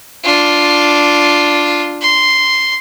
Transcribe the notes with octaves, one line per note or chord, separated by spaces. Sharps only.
D4 F4
C6